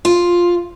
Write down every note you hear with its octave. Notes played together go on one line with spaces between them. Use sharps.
F4